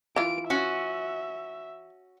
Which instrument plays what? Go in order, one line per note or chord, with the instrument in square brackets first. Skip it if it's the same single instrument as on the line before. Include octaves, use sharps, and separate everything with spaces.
[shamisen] E3 F4 [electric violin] D7
[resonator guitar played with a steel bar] C#4 F#4 [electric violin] E5